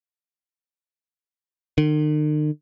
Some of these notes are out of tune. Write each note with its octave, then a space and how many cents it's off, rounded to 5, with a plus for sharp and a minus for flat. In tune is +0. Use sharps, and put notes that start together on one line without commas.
D#3 -45